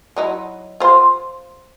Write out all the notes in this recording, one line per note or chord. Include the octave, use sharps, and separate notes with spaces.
F#3 D#4 E4
F4 C5